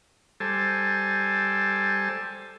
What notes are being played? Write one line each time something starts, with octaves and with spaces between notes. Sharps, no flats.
G3 A4 C5 G#5 A5